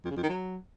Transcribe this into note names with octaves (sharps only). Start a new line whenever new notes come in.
F2
C#3
F2
D#3
F#3